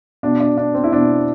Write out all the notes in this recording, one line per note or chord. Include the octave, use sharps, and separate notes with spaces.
B2 D4
D4
D4
C4
E4
B2 D4